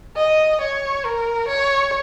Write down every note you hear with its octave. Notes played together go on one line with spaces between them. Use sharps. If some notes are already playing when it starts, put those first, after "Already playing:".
D#5
C#5
A#4
C#5